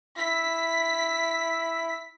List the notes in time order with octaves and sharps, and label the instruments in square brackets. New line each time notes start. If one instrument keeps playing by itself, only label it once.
[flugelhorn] E4 [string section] B6